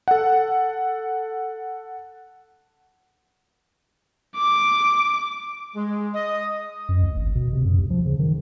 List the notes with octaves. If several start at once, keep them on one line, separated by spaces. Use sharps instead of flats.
A4 F#5
D6
G#3
D#5
F#2
D2
G#1
B2
C3
F#2
D2
F3
C#3
D#3